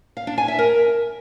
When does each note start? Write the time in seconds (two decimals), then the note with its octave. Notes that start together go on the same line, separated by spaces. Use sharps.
0.17 F5
0.27 D4
0.38 G#5
0.48 E5
0.59 A#4